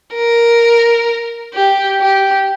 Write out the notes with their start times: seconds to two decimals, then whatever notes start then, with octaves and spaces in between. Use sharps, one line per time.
0.15 A#4
1.54 G4
2.01 G4